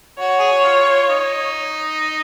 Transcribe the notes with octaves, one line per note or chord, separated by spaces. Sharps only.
F#4 C#5
G#4
F#4
F4
D#4